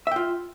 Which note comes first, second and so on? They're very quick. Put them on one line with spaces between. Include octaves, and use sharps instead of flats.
E5 G5 F4